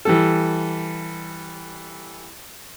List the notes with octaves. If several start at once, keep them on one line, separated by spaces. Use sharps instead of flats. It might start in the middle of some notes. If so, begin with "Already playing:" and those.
E3 G3 A4